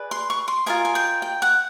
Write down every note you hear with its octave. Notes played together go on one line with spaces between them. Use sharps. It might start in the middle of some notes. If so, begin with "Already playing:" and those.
Already playing: G#4 B4 D5
C6
C#6
C6
F4 A#4 D#5 G#5
G#5
G5
G5
F#5